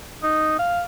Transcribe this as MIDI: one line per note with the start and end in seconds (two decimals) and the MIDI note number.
0.23 0.58 63
0.59 0.83 77